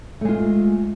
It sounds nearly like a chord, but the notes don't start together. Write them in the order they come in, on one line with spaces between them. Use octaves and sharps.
A3 G#3 F4